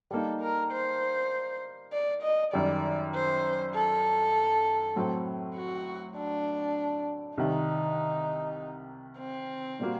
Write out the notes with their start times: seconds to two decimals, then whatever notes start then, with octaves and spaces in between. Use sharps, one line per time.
0.11 G3 A#3 D#4 A4
0.41 A#4
0.72 C5
1.93 D5
2.23 D#5
2.53 F#2 D#3 G3 D5
3.14 C5
3.74 A4
4.96 A2 F#3 C4
5.55 F#4
6.16 D4
7.37 C2 C3 D#3 D#4
9.19 C4
9.80 A#2 G3 A#3 F#4